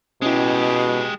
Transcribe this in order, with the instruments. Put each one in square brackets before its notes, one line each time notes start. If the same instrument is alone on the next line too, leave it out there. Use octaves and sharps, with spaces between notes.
[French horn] B2 [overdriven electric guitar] G#3 G4 [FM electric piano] C#4 E4